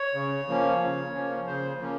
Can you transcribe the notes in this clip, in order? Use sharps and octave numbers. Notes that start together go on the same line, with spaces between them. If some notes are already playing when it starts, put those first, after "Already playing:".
Already playing: C#5
C#3
F3 A#3 C#4
C#3
F3 A#3 C#4
C#3 C5
F3 A#3 C#4